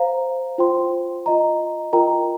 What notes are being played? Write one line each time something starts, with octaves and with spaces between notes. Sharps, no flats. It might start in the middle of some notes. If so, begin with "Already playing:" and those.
Already playing: C5 F5 A#5
F4 C5 G5 C6
F4 D#5 A#5
F4 A#4 D#5 G5 A#5